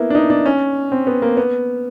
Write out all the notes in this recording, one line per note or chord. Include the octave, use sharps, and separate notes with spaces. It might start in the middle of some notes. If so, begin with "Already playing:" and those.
Already playing: A#3 B3 E4
D4
D#4
D4
C#4
C4
B3
A#3
B3